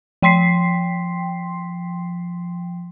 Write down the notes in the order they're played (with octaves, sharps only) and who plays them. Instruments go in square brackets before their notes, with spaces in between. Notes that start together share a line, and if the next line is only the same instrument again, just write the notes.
[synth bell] F3 G5 C6 B6 C7